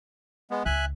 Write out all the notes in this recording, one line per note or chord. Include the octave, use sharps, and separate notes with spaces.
G#3 B3
C#2 E5 G#5 F#6